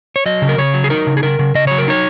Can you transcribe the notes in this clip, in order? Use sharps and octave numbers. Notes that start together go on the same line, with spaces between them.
C#5
F#3 D#5
C#3
A#4
C#3 C#5
F#3
G#4
D#4 A#4
C#3
G#4
C#3 A#4
C#3
C#3 D#5
F#3 C#5
A#4
D#4 C#5